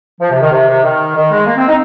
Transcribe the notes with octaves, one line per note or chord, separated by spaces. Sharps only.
F3
C3
D#3
C3
C3
D#3
D#3
G#3
A#3
C4
D#4